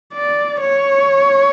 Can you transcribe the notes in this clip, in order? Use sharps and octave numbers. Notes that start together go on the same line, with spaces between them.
D5
C#5